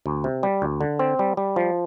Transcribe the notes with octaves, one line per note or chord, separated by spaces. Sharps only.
D2
C3
G3
D2
D3
C4
G3
G3
F3